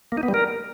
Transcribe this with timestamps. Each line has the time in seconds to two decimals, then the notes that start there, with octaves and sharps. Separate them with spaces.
0.12 A#3
0.17 D#4
0.23 B3
0.28 G3
0.34 A#4